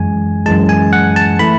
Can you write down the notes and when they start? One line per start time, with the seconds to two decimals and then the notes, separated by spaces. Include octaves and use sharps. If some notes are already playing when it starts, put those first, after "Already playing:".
Already playing: F#2 E3 G#3 G#5
0.46 F#2 E3 G#3 A5
0.69 G#5
0.93 F#5
1.16 A5
1.39 E3 A3 B5